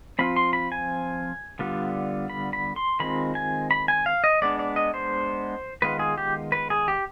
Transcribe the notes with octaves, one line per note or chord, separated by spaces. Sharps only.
F3 C4 F4 B5
C6
B5
G#5
D3 G3 B3 F4
B5
B5
C6
D#3 G#3 C4 F4 B5
G#5
B5
G#5
F5
D#5
G#3 B3 D4 D5
D5
D#5
C5
D#3 G#3 B3 F4 B4
G#4
G4
B4
G#4
G4